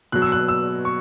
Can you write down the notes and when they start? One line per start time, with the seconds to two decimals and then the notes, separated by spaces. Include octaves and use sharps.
0.12 B2 F#3 F#6
0.22 E6
0.32 F#6
0.48 E6
0.85 C#6